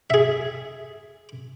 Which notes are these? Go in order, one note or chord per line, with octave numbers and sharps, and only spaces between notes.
G#4 E5